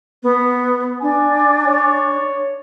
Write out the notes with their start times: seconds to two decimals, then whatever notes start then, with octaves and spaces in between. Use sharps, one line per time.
0.23 B3
1.02 D4 G#5
1.66 C#5